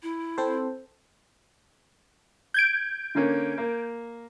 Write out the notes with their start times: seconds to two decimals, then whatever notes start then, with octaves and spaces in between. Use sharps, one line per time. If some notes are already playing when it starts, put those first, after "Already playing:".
0.03 E4
0.38 C4 A4 C5
2.54 G6 G#6 D7
3.15 D3 A#3 C#4
3.58 A#3